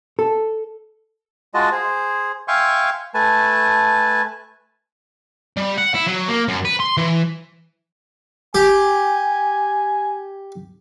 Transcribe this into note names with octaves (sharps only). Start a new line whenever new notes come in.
A4
G#3 F4 F#4 D#5 A5
G#4 C5
E5 F5 G5 G#5 C6 C#6
A3 B4 G#5 A5
G3
F#5
E4
F#3
A#3
F#2
B4
C6
E3
G4 G#5